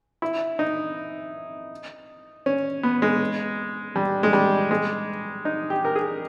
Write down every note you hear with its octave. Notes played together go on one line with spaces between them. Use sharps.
E4
D#4
C#4
B3
G#3
G3
G#3
G3
G#3
D#4
G4
A#4
G#4